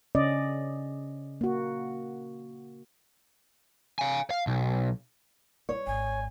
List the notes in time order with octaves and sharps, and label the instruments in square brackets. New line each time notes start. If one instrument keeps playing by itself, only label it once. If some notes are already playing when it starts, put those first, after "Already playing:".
[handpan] C#3 C#4 D5 D#5
A#3 F#4
[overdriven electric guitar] F5 G#5
F5
B1
[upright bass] G3 E4 [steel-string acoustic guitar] C#5
[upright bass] G#1 [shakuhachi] G#5